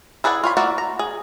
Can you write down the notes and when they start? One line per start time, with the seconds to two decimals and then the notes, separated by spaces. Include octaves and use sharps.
0.24 E4 G#4 B4 D5 F#5
0.44 F4 C#5 B5
0.57 A#3 E4 F#4 D5 F#5
0.78 A#5
0.99 G#4